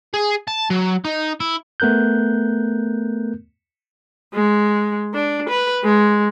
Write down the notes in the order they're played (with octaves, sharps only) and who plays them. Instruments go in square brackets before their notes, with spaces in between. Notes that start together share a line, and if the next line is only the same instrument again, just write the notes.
[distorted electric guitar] G#4
A5
F#3
D#4
E4
[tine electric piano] A3 B3 A#4 F#6 G6
[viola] G#3
D4
B4
G#3